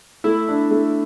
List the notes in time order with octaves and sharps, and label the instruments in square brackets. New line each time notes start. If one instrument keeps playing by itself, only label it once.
[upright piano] A3 [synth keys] E4
[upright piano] D4
A3